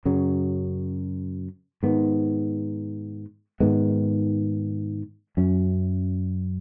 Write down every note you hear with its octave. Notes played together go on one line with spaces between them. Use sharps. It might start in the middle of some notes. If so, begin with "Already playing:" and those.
F#2 C#3 F#3
G#2 D#3 B3
G#2 D#3 G#3 B3
F#2 F#3 C#4